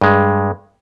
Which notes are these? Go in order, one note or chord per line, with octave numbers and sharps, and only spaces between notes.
G2 G#3